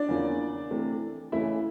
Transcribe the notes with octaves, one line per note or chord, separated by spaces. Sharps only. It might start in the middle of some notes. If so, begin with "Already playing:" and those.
Already playing: D4 D5
E2 C#3 F3 A#3
C3 E3 A3
C#3 E3 A3 E4 E5